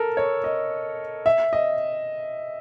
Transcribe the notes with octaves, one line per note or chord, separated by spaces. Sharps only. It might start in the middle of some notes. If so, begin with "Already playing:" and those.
Already playing: A4 A#4
C#5
D#5
E5
D#5